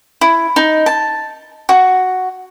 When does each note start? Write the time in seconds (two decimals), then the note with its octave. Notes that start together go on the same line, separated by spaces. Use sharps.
0.21 E4
0.56 D#4
0.86 A5
1.69 F#4